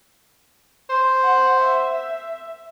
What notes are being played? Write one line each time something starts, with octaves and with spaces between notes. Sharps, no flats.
C5
F#5
E5